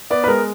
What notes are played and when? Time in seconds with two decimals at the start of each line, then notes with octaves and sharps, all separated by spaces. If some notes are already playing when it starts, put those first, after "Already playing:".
0.10 B3 D5
0.24 B4
0.27 G#3 A#4